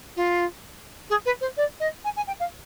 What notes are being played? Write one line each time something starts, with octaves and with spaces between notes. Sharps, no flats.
F4
G#4
B4
C5
D5
D#5
G#5
G#5
G5
F5